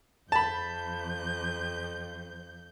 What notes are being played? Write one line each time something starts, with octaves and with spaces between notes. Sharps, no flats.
F2 A5 B5 G6